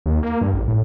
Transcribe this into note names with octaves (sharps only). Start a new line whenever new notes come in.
D#2
A#3
G2
A1
A2